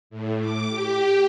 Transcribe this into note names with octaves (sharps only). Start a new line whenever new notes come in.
A2
D6
G4